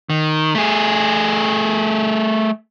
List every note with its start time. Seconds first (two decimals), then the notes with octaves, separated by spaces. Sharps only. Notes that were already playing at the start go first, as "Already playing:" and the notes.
0.10 D#3
0.55 A3 G#4